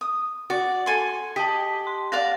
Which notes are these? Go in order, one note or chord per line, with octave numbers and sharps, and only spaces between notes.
D#6
F#4 D5
A4 G#5 C6
G4 D#5 A5 B6
C6
D5 F5 F#5 A#6